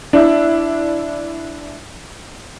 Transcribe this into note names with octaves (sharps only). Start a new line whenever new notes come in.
D4 E4